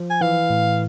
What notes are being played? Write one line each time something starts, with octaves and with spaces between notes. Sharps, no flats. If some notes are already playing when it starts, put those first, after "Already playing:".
Already playing: F3
G#5
E3 F5
A2